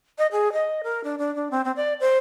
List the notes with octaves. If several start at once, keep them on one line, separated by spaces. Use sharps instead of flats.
D#5
G#4
D#5
A#4
D4
D4
D4
C4
C4
D5
C5